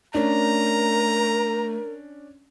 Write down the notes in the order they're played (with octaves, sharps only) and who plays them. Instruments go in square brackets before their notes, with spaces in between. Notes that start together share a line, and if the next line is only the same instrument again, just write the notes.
[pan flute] A3 [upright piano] C#4 D4 [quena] A#4 [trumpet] A#5